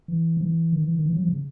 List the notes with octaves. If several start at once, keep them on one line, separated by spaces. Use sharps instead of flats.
E3
F3
E3
D#3
E3
D#3
E3
F#3
F3
C#3